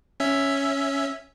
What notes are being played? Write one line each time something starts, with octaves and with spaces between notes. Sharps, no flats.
C#4 E5